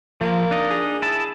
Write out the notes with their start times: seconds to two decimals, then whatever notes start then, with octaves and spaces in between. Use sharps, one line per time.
0.21 F3 A#3
0.51 D4 D#4 D#5
0.71 G#4
1.02 E4 A5